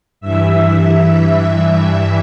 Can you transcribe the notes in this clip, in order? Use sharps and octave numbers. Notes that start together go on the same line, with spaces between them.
G2 E3 E5